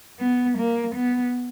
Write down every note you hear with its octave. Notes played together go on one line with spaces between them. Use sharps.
B3
A#3
B3